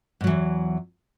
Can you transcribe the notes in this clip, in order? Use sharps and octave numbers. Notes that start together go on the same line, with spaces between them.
E2 G#2 E3 F#3